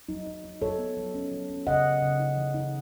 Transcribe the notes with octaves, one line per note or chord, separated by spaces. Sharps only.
F#3 D#4
D#4
D#4
F#3 A4 C#5
B3
F#3
C#4
F#3
C#4
C#3 D#5 F#5
F#3
C#3
D#4
E3
D#4